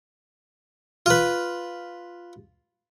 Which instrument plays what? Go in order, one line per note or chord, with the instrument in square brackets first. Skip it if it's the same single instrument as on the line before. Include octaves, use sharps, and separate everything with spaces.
[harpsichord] F4 B4